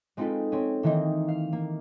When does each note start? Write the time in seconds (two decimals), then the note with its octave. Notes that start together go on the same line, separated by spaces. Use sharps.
0.17 G#3 C4 D#4 F4 A4 B4
0.52 C4 C#4
0.83 D#3 E3 A#3 C4 D#4
1.28 F5
1.53 A#3